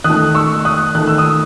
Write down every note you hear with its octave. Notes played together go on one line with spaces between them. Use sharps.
D#3 D#6 F#6
A3
C#6 E6
D#6 F#6
D#3 A3 F#6
E6
D#6